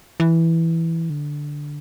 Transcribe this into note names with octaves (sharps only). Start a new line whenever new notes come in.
E3
D3